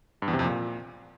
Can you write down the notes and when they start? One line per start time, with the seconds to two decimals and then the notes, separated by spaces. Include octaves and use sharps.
0.22 G2
0.28 E2
0.33 C3
0.39 F2
0.45 A#2